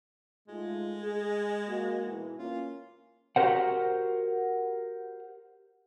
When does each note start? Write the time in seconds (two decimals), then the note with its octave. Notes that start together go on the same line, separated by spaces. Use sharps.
0.48 G#2 G#3 A3 F4
1.01 G#4
1.67 A#3 F#4
2.06 G#2 B2 E3
2.38 A#3 C#4 F4
3.36 F#4 G4 A4 A#4 C5 F#5